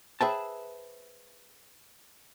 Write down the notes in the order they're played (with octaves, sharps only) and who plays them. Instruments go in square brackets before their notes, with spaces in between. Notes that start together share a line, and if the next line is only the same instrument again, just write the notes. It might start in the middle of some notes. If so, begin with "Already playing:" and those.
[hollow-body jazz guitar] G#4 B4 C5 E5 G5 A5